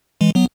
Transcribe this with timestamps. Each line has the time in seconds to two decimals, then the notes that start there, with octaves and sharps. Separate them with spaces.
0.21 E3 G#3
0.35 F#3 B3